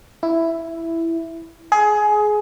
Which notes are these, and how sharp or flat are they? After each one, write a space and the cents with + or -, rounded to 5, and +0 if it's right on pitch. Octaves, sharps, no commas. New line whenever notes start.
E4 +5
G#4 +20